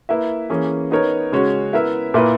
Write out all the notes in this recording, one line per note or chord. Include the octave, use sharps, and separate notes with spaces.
A#3 E4 B4 E5
E3 A#3 C#4 G#4
B3 D#4 A#4 C#5
C#3 G#3 C#4 F#4 C#5
B3 E4 A#4 E5
A#2 A#3 E4 B4